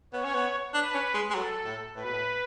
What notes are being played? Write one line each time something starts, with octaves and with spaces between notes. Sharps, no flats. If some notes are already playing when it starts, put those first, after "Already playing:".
B3 C#5
C#4
B3
D4 B4
C#4
G#3
G#3
F#3 A4
A2
A2 B4
B2
A2